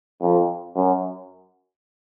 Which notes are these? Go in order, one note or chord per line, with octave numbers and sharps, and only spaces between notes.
F2
F#2